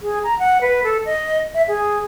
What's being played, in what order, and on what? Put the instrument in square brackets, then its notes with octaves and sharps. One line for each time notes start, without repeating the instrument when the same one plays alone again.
[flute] G#4
A#5
F#5
B4
A4
D#5
E5
G#4